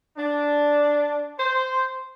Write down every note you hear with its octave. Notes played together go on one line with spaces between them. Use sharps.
D4
C5